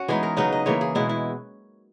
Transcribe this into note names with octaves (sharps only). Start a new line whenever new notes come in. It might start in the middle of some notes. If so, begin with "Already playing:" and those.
Already playing: C#4 F#4
E3 G#3 B3 D#4 G#4
A#4
C#3 F#3 B3 D#4 B4
D#5
C#3 E3 A#3 C#5
G#4
B2 G#3 B3 E4
E4